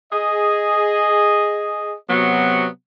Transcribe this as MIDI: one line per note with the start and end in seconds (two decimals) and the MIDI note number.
0.13 1.94 68
0.13 1.94 75
2.10 2.67 48
2.10 2.67 54
2.10 2.67 59
2.10 2.67 66